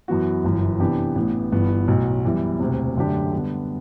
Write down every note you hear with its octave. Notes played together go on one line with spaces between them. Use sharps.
F#2 E3 B3 F#4
G1 F#2 E3
C3 E3 B3 D4 G4
A1 A2 E3 B3
G1 G2 E3 B3
B1 A2 F#3
F#2 E3 G3 B3 E4
E1 D2 C3
F#2 D3 A3 D4 G4
D3 G3 B3